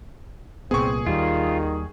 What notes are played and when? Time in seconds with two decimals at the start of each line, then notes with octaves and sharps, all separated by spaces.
0.71 C2 A#2 B3 C4 G#4 C#6
1.06 D#2 D#3 G3 F4